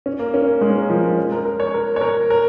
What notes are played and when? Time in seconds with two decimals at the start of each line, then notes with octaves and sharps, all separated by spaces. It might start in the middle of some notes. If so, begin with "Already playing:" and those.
0.06 C#4
0.19 A#3
0.34 C#4
0.47 A#3
0.61 G#3
0.70 C#4
0.75 A#3
0.90 F3
1.04 G#3
1.17 C#4
1.32 A#4
1.45 A#4
1.60 C#5
1.74 A#4
1.96 C#5
2.01 A#4
2.30 A#4